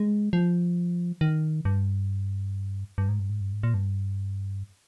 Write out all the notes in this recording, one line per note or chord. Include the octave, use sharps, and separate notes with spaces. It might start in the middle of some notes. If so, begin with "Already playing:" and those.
Already playing: G#3
F3
D#3
G2
G2
G#2
G2
G#2
G2
G#2
A#2
G2